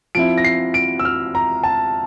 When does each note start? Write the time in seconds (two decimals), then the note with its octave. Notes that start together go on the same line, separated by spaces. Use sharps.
0.15 F3 C4 E4 D7
0.38 A#6
0.44 C7
0.74 D7
0.99 E6
1.05 F6
1.35 A#5
1.63 A5